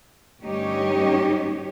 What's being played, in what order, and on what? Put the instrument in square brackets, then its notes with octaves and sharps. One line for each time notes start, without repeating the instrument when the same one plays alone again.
[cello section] D2 G2 C#4 D#4 G4 C#5